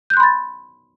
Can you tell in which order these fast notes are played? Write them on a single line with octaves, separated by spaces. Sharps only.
G6 F#6 C6 B5 A6